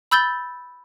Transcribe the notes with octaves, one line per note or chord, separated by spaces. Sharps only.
B5 E6 G6 A6 G7